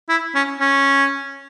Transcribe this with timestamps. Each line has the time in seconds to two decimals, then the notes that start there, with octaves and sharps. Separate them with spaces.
0.09 E4
0.35 C#4
0.60 C#4